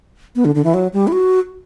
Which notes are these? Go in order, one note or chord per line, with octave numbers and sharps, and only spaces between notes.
B3
D3
D3
E3
F#3
G3
E4
F#4